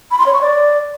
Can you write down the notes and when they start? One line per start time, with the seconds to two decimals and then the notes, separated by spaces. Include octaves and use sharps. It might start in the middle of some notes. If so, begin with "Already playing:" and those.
0.11 B5
0.19 C6
0.26 C#5
0.34 C#6
0.41 D5